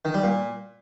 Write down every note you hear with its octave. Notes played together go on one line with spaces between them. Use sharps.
D#3
G3
A#2